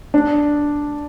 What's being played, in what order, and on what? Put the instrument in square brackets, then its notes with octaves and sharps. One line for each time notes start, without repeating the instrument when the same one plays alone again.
[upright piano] D4